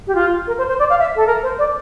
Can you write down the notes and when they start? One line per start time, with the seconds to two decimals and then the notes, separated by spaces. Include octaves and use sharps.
0.07 G4
0.15 F4
0.47 A#4
0.58 C5
0.68 C5
0.79 D5
0.89 F5
0.99 E5
1.16 A4
1.26 A#4
1.43 C5
1.58 D5